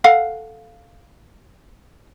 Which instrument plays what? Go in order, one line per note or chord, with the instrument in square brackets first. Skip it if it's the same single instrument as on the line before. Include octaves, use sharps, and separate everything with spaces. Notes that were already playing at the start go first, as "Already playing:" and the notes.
[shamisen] A4 F5 F#5